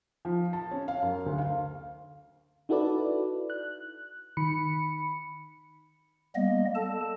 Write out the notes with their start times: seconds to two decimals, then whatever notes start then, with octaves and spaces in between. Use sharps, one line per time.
0.25 F3
0.53 A5
0.71 C#4
0.88 F5
1.02 F#2
1.26 D2
1.38 F5
2.69 D#4 E4 F#4 A4 B4 D5
3.50 F#6
4.37 D#3 B5 C#7
6.35 G3 A#3 B3 D#5
6.75 A4 A5